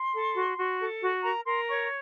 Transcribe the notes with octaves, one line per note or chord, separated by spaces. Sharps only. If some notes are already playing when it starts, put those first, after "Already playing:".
Already playing: C6
A4
F#4
F#4
A4
F#4
A#4 A#5
A#4 C6
C#5 C#6